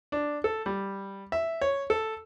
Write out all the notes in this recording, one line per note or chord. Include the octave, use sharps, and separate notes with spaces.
D4
A4
G3
E5
C#5
A4